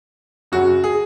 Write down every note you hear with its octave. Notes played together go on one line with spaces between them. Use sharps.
F#2 C#3 F#3 F#4
G#4